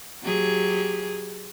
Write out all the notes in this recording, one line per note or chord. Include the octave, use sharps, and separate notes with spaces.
F#3 G4 G#4